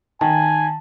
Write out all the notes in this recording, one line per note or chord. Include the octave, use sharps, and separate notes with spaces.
D#3 G#5 A5